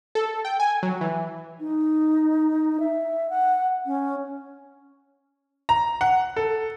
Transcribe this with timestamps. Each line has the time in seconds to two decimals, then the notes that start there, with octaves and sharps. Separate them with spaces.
0.15 A4
0.45 G5
0.60 G#5
0.83 F#3
1.01 E3
1.60 D#4
2.80 E5
3.30 F#5
3.86 C#4
5.69 A#5
6.01 F#5
6.36 A4